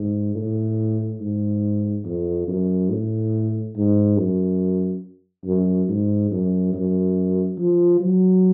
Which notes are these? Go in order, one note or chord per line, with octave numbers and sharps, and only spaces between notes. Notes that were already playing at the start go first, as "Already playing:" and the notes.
Already playing: G#2
A2
G#2
F2
F#2
A2
G#2
F#2
F#2
G#2
F#2
F#2
F3
F#3